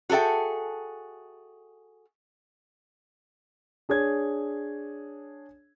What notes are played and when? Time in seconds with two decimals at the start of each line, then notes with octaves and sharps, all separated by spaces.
0.10 F#4 G#4 A4 E5 G5
3.89 D4 G#4 C#5 G#6